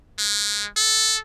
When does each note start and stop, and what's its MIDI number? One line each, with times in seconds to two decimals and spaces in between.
0.19 0.67 56
0.77 1.19 69